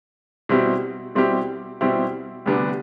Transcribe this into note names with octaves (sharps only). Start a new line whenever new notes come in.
B2 G3 C4 E4 G4
B2 G3 C4 E4 G4
B2 G3 C4 E4 G4
D2 C3 G3 B3 D4